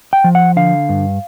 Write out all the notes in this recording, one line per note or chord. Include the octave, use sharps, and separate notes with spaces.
G5
F3
F#5
D3 F5
G2